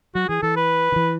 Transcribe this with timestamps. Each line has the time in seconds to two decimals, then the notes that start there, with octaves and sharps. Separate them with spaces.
0.15 F#3 F#4
0.29 E3 G#4
0.42 E3 A4
0.56 B4
0.92 D#3
0.96 E3